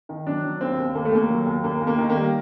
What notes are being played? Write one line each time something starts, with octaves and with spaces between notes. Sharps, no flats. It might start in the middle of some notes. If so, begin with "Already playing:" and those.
D#3
F#3 D4
F#3
D#2 C4
D#2
D#2 A#3
A3
D#2 A#3
F#3
D#2
D#2 A#3
D#2
A#3
D#3
A#3
G3